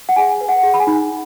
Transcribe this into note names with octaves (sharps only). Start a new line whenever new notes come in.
F#5
G#4 G#5
B4
F#5
G#4
B5
G#5
D#4